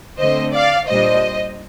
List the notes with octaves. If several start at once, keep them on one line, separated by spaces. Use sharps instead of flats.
D3 A3 C4 C5 D#5
D5 F5
A#2 G3 D4 C5 D#5